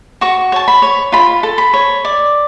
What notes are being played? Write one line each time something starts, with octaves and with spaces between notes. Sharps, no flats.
F#4 C#6
C#5 A5
B5
C#5
F4 B5
A4
B5
C#5
D5